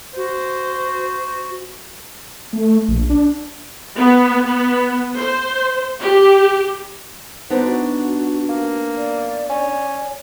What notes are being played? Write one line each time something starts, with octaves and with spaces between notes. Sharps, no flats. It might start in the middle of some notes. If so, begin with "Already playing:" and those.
F#4 C5
A3
A#1
D4
B3
B3
C5
G4
B3 D4 D#4 C5
F#4
A#3
D5
C#4